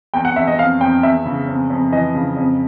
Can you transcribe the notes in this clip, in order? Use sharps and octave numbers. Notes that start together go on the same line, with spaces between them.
E2 G5
F#5
E2 E5
D#5
F2 F5
F2 G5
E2 E5
C#3
F2
F2
E3 D#5
C#3
F2